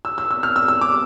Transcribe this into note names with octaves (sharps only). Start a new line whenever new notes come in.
E6
E6
E6
F6
E6
E6
D6